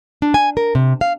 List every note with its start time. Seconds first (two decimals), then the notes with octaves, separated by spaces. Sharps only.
0.22 D4
0.34 G#5
0.57 A#4
0.75 C3
1.01 F5